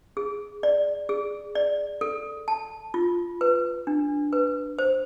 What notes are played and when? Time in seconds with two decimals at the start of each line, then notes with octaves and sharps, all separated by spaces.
0.17 G#4
0.63 D5
1.09 G#4
1.55 D5
2.01 A4
2.48 A5
2.94 F4
3.41 B4
3.87 D4
4.33 B4
4.79 C5